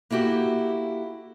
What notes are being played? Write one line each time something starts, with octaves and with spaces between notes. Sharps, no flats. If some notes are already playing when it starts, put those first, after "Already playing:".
A#3 E4 F#4 G4 A4